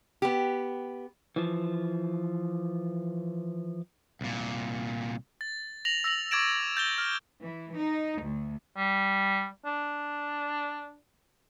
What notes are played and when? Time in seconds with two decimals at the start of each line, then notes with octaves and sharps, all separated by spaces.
0.22 B3 G4
1.36 E3 F3
4.21 C2 A#2
5.41 A6
5.85 A#6 F7 F#7
6.04 E6 A#6 F7 F#7
6.31 C#6 D6 G#6 A6 D7 E7
6.77 G6 A6 G7
6.98 F6
7.41 E3
7.74 D#4
8.21 D2
8.77 G3
9.66 D4